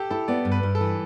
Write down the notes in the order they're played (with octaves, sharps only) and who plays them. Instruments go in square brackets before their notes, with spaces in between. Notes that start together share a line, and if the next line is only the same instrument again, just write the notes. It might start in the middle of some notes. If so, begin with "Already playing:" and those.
Already playing: [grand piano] G4 A4
[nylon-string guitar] E4 [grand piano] A4
[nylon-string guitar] B3 [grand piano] D5
[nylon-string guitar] G2
[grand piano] B4
[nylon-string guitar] G2
[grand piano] A4
[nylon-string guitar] E3